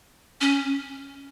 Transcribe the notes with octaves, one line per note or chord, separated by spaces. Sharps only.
C#4